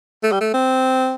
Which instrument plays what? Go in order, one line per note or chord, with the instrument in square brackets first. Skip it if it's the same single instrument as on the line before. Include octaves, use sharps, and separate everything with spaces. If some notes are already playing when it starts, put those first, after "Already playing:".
[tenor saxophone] A3
G3
A3
C4